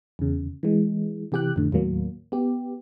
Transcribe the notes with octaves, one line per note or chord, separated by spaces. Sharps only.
E2 C#3
E3 G#3
C3 E3 G4 G5 F#6
F2 A2 D3
D#2 A2 F#3 A#3
B3 G4